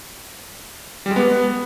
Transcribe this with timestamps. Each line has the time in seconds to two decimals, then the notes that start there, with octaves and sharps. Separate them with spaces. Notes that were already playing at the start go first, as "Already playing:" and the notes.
1.06 G3
1.11 G#3
1.16 B3